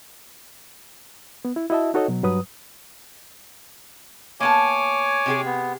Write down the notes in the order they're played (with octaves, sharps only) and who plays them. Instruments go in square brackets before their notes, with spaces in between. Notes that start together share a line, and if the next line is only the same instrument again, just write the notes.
[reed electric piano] B3
E4
E4 F#4 D#5 E5 A5
D#4 F#4 A4 C#5 D#5
B2 F#3
G2 F#3 B4 D#6
[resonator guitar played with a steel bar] A#3 B3 A5 [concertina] C#5 G#5 D6
[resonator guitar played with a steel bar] C3 G4 G#4
[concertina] B3